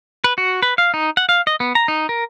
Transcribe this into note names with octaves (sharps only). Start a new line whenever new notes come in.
B4
F#4
B4
F5
D#4
F#5
F5
D#5
B3
A#5
D#4
A#4